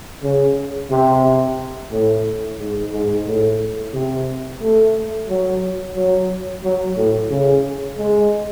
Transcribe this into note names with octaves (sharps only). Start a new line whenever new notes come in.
C#3
C3
A2
G#2
G#2
A2
C3
A3
F#3
F#3
F#3
A2
C#3
G#3